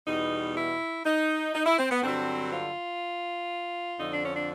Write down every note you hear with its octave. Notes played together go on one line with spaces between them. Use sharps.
E2 B2 G3 D#4
E4
D#4
D#4
E4
C4
B3
G2 D3 F#3 C4
F4
F2 D3 F3 D#4
D4
C#4
D4